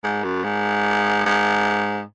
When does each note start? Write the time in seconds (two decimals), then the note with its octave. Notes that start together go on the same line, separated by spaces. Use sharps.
0.04 G#2
0.24 F#2
0.44 G#2
1.25 G#2